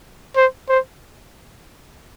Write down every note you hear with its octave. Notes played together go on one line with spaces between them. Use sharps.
C5
C5